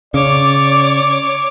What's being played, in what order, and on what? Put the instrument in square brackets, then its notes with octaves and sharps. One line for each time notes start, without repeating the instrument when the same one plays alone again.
[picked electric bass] C#3 [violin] C#5 D6 [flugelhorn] D5